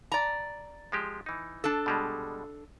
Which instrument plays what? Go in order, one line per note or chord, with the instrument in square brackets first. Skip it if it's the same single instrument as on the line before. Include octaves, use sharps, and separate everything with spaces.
[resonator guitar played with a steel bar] D5 A#5
[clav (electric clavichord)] F3 G#3 G4
E3 D#4
[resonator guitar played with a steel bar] D4 A4
[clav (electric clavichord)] B2 G3 G#3